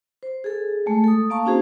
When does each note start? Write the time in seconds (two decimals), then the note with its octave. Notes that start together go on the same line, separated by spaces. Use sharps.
0.23 C5
0.44 G#4 A4
0.86 G#3 A3
1.04 A4 D#6
1.30 A#3 F5 A5 C#6
1.45 C4 C#4 D#4 F#4 G#4 C5